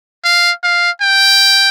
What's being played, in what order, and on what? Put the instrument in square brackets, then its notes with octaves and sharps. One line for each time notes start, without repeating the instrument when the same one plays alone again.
[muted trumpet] F5
F5
G5